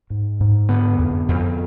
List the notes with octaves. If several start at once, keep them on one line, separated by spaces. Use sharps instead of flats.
G#2
G#2
D3 B3
F2
F2